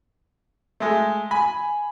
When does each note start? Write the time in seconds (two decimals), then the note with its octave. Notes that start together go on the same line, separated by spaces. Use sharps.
0.80 G#3 A3
1.31 G#5 B5